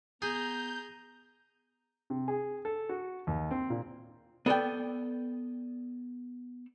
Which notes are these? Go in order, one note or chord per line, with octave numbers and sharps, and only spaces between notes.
B3 G#4 A#5 G6
C3
G#4
A4
F#4
D#2
C4
A#2
B3 A4 D5 G5